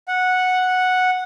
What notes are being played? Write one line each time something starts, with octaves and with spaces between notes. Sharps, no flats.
F#5